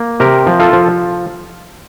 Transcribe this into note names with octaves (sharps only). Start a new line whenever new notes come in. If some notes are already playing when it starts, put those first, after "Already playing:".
Already playing: A#3
C3 G4 A#4
F3
F4 A4
F3